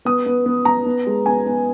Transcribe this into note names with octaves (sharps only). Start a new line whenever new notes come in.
B3 D#6
B3
B3
B3 A#5
B3
G#3
B3 G#5
B3